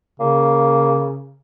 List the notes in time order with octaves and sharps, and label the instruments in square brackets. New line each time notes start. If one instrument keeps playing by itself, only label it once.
[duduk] C#3 [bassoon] A#3